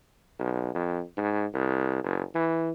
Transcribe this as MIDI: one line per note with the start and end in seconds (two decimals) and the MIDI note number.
0.39 0.73 35
0.75 1.02 41
1.17 1.46 44
1.54 2.02 36
2.04 2.23 30
2.35 2.72 52